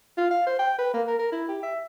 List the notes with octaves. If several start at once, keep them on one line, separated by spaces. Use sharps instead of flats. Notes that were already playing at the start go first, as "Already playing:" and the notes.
F4
F5
C5
G5
B4
A#3
A#4
A#4
E4
G4
E5